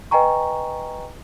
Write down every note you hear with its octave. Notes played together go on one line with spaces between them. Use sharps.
B4 D#5 G5 G#5 A#5 C#6